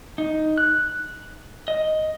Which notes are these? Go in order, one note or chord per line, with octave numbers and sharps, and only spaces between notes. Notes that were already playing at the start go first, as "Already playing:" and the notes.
D#4
F#6
D#5